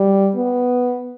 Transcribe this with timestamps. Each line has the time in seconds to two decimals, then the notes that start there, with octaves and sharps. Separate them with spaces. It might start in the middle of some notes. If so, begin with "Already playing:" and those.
Already playing: G3
0.36 B3